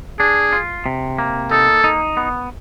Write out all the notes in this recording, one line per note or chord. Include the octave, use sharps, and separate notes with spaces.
D4 G#4
F4
C3
A#3
D#4 A4
D#4
B3